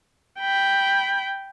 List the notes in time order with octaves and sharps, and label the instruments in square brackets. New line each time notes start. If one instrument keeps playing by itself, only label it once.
[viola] G5 B5